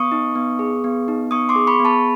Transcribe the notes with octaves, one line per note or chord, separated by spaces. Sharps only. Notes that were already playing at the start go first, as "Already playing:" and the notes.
Already playing: B3 C#6 D#6
D#4
B3
G#4
B3
D#4
B3 C#6 D#6
C6 D6
G#4
B5 C#6
B3
A5 B5